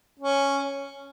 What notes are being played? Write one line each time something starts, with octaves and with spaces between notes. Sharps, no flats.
C#4